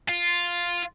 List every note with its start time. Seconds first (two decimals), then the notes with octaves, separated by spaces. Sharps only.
0.09 F4